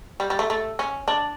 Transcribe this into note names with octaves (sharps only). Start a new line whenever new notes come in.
G3
G3
A3
A3
C#4
D4